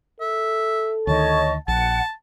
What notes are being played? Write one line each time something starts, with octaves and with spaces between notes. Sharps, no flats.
A4 E5
D2 D#3 C#5 D#5 A5 C#6
A#1 F#5 A5